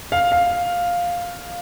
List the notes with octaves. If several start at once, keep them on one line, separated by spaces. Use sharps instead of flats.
F5
F5